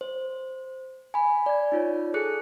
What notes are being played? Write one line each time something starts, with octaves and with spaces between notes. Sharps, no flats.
C5
G#5 B5
D5 G#6
D#4 F4 C#5 D5
G#4 A4 F#6 C#7